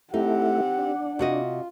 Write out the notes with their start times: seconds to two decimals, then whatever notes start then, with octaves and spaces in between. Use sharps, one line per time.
0.14 A3 C4 D#4 E4 G4 F#5
0.79 D4
1.19 C3 F4 F#4 D#5